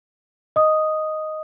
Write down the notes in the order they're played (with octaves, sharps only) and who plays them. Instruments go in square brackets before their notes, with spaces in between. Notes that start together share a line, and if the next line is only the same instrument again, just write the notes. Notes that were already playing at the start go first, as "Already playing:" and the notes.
[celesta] D#5 D#6